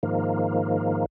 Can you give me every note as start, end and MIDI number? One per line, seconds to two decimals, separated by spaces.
0.03 1.05 44
0.03 1.05 51
0.03 1.05 53
0.03 1.05 58